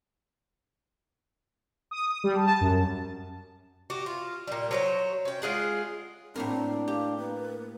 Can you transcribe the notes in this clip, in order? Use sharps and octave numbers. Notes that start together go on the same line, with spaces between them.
D#6
D#6
G3
A5
A5
F#2
F#4 G4
F4
A#2 G3
F#3 C5 C#5
C#4 G5
G#3 F4 G#4 F#5
A2 A#3 C4 D4 A#4
G4 F5
A#3 B4